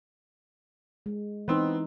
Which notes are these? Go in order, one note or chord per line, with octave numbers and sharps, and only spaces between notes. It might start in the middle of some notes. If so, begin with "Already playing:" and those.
G#3
E3 B3 C4 D#4